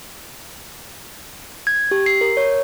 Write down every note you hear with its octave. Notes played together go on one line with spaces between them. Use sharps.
G#6
G4
C7
A#4
C#5